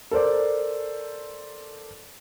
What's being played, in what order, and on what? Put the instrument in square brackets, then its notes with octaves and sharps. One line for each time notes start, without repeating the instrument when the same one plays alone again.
[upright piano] A4 A#4 C5 D5